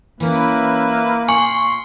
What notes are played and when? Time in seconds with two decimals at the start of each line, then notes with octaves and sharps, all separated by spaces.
0.20 E3 A#3 C#4 E4 B4
1.28 A#2 G#5 C6 C#6